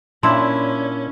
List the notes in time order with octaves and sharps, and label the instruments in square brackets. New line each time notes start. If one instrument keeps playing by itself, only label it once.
[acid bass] A#2 [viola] C#4 [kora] D4 E4 [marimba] C6